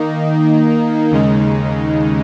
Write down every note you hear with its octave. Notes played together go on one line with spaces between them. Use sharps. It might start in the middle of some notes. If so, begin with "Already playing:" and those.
Already playing: D#3 A#3 D#4
D#2 C#3 G#3 D#4